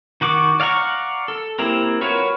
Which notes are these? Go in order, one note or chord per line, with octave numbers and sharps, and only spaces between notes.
D#3 F#4 D6
D5 F5 F#5 A#5 C#6
A4
A#3 C4 E4 G4 A#4
F4 F#4 A#4 B4 C#5